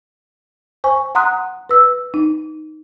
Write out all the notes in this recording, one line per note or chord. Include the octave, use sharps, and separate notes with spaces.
C5 G#5 C#6
F#5 A#5 C6 D#6 F#6
B4 E6
D#4